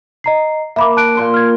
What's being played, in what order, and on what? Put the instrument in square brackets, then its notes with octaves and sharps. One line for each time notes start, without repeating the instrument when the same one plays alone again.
[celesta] D#5 A#5 C7
[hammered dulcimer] A#3 [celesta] E5 B5 D6
[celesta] A5 F#6 D7
[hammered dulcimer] A#2 C6 C#6
[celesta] F6 G#6